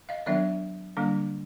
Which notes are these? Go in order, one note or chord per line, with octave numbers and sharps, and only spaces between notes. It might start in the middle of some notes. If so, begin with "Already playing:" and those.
D#5 F5
D#3 F#3 B3 D4 D5 E5
D3 G3 A#3 D4